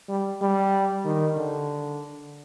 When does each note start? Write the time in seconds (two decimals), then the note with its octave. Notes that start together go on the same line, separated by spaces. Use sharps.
0.09 G3
0.41 G3
1.05 D#3
1.37 D3